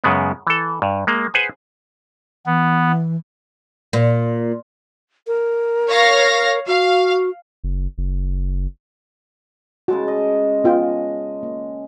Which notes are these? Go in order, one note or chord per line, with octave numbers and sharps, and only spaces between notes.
F#2 C#3 G#3 B3
E3 A4
G2
G#3 A#3
G#4 B4 C5 F#5 G#5
E3 B3
A#2
A#4
C#5 F5 A#6
F#4 F5
F#1
F#1
C#3 G#3 F#4 A5
D#5
B3 F4 G5
A#3